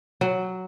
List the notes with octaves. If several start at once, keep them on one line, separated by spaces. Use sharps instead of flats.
F#3